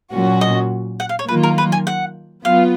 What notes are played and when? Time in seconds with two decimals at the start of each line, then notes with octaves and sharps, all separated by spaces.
0.12 A#2 F#3 C#4 F#4
0.41 D#5
1.00 F#5
1.09 F5
1.19 C#5
1.29 D#3 F#3 A#3 F4 B4
1.43 A#4
1.58 B4
1.72 G#5
1.87 F#5
2.45 F#3 B3 F4 F5